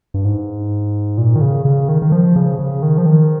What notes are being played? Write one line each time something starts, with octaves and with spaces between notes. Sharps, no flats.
G2
G#2
A#2
D#3
C#3
C#3
D#3
D#3
F3
C#3
C#3
D#3
F3
D#3